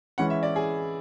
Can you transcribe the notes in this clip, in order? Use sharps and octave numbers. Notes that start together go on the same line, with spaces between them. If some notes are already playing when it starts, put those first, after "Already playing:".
E3 G#3 C#4 E4 F#5
E5
D5
G#4